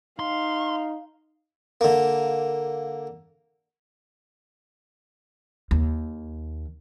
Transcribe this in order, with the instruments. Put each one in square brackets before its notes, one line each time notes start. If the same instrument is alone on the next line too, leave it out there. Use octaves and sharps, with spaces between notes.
[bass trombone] D#4 [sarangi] F5 [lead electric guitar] C6
[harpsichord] D3 A#3
[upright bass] D#2